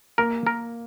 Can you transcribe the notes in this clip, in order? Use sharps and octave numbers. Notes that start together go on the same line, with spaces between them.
A#3 A#4
A#4